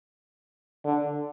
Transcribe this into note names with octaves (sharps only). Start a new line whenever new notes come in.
D3